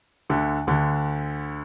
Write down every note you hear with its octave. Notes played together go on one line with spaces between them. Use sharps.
D2 D3
D2 D3